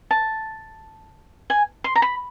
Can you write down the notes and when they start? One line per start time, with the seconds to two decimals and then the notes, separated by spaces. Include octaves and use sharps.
0.11 A5
1.50 G#5
1.84 C6
1.96 A#5
2.02 B5